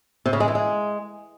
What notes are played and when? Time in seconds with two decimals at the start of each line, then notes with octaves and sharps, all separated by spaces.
0.26 C3
0.33 C#3
0.40 G#3
0.48 E3
0.55 G#3